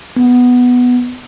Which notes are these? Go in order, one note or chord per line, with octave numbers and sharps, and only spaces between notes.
B3